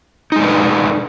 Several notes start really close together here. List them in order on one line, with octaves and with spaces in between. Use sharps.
D#4 G#3 D4 B4 A4